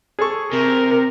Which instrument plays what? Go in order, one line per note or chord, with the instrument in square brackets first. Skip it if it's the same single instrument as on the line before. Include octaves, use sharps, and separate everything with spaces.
[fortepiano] G#4 A4 C#6
[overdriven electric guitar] C3 [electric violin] A#4